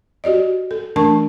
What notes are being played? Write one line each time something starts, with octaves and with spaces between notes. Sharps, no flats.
F#4 G4 D5 D#5
A4
E3 A3 D4 A#4 A5 C#6